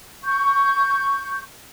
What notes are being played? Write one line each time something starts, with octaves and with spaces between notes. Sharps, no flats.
C#6 G6